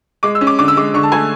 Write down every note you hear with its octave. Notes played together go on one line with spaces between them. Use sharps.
G#3 D6
E6
C#4
D6
D3 D6
E6
G#3 D6
D3 C#6
A5
A3 G#5